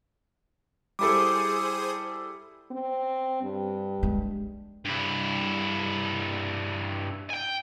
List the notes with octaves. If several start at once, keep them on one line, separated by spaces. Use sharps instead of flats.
G3 E4 G#4 A4 C5 D6 D#6
C4
G2
G#3
G2 E4
G5 G#5